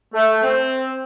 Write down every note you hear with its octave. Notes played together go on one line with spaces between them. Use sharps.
A3
C4